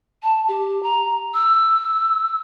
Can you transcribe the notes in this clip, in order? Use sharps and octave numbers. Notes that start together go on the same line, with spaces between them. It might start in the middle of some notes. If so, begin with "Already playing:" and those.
A5
G4
A#5
E6